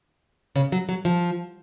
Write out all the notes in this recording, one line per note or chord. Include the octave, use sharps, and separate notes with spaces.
C#3
F#3
F#3
F3